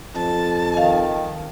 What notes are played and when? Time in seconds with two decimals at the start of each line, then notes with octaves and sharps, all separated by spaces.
0.15 F2 A5
0.74 D#3 D#5 F5